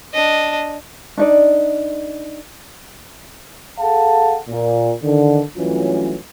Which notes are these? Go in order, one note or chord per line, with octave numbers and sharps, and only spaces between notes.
D4 D#5
D4 D#4 D5
G#4 A4 F5 F#5 A5
A#2
D3 D#3
G2 E3 F#3 A3 C#4 F4